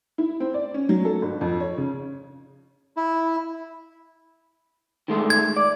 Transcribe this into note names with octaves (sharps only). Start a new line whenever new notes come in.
E4
C4
D5
C#4
F#3
A4
G1
F2
C#5
C#3
E4
D#3 G#3 A3
G#6
D5